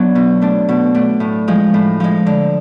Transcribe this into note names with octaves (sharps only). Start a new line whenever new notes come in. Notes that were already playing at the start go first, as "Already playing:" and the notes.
Already playing: F#3 B3 D4
B2
A3 D4
B2
A3 D4
A2
F3 G#3
A2
F3 G#3
D3